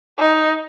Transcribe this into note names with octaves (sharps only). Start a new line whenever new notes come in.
D#4